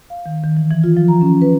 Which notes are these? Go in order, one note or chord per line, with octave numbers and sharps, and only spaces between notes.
F5
D#3
D#3
E3
E3
F4
F3
A#5
C#4
B4